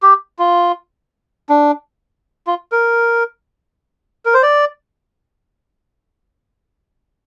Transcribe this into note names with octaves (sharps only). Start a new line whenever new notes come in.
G4
F4
D4
F4
A#4
A#4
C5
D5